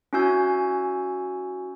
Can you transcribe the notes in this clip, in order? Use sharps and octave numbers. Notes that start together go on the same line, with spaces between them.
C#4 E4 F#4 G#5 E6 G6